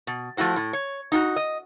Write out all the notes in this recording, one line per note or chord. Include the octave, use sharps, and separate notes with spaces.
B2
F3 A3 E4 F#4 C5
A2
C#5
D#4 F4 F#4
D#5